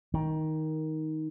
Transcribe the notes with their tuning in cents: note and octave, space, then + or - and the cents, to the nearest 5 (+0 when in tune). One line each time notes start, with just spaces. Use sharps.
D#3 +10